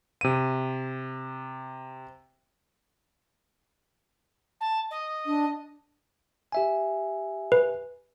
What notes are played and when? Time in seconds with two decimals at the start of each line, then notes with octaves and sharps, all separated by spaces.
0.21 C3 D#7
4.61 A5
4.91 D#5
5.26 D4
6.52 G4 E5 G#5
7.52 B4